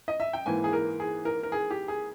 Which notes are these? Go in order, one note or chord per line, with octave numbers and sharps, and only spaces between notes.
D#5
E5
G5
G#2 E3 A#3 G#5
G#4
A#4
G#4
A#4
A#4
G#4
G4
G#4